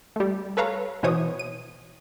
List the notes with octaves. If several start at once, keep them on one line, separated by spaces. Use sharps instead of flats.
G3 A3
A4 B4 C#5 F5 A#5
B2 E3 C5 C#5 D#6
D#7